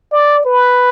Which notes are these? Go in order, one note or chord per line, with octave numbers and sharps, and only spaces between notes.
D5
B4